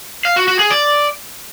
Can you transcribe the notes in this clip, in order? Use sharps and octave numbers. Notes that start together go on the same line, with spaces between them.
F5
F#4
F#4
G#4
D5